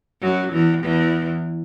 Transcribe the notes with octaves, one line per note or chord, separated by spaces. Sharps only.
F#2 F#3
E2 E3
E2 E3